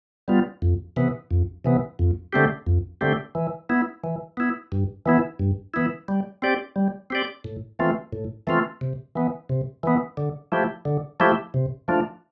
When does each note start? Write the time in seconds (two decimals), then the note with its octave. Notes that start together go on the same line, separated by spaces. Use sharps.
0.28 G3 B3 F4
0.62 F2
0.96 C3 E3 B3
1.31 F2
1.65 C3 E3 B3
1.99 F2
2.33 D3 A3 C4 G4
2.66 F2
3.01 D3 A3 C4 G4
3.35 E3
3.69 B3 E4
4.04 E3
4.37 B3 E4
4.72 G2
5.06 E3 B3 E4
5.39 G2
5.74 E3 B3 E4
6.08 G3
6.42 C4 G4 D5
6.76 G3
7.10 C4 G4 D5
7.44 A2
7.79 E3 A3 C4 F4
8.12 A2
8.47 E3 A3 C4 F4
8.81 C3
9.15 E3 B3
9.49 C3
9.83 E3 B3
10.17 D3
10.52 F3 A3 E4 G4
10.85 D3
11.20 F3 A3 E4 G4
11.54 C3
11.88 F3 A3 D4 F4